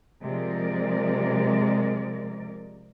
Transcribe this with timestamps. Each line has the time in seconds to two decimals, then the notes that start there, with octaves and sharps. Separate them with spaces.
0.22 C3 F3 G#3 A#4 D5